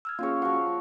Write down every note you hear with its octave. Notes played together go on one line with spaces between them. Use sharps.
E6 F6 G#6
A#3 C#4 F4 G#4 C#5
F3 F#4 F#5 C#6